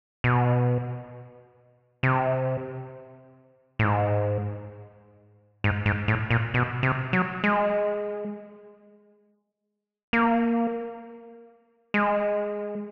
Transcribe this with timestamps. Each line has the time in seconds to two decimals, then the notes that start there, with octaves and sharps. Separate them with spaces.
0.24 B2
2.03 C3
3.79 A2
3.84 G#2
5.64 G#2
5.86 G#2
6.08 A2
6.31 A#2
6.54 B2
6.83 C3
7.13 F#3
7.44 G#3
10.13 A#3
11.94 G#3